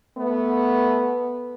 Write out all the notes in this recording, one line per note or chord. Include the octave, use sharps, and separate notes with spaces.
A3 B3